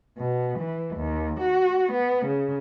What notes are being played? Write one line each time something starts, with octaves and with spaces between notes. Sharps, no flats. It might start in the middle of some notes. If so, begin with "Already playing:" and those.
B2
E3
D#2
F#4
B3
C#3